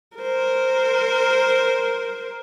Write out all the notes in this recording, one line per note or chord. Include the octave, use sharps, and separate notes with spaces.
A#4 C5